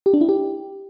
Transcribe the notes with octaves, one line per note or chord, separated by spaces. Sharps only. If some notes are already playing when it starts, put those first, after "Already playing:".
G4
D4
E4
G4